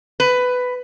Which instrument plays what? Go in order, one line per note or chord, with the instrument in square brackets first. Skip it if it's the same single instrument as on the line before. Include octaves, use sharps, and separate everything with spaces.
[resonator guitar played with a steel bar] B4